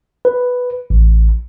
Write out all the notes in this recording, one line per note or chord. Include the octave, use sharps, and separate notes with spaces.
B4
A1